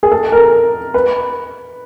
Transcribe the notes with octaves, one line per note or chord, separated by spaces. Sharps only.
G#4
A4
A#4
B4